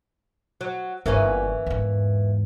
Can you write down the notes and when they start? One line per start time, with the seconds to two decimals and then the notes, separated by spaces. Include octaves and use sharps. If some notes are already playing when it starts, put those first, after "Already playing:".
0.61 F#3
1.06 G1 E3 A#3 C#4
1.66 E2 G#2